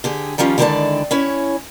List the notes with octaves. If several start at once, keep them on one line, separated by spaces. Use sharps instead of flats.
D3 G4 G#4
D#3 F3 G3 C#4 F4
D3 D#3 G#3 E4 D5 A5
C#4 E4 C#5